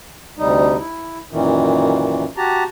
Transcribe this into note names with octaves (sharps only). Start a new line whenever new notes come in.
D2 C3 G3 D#4
E4
F#2 A#2 D#3 E3
F#4 G4 A5 A#5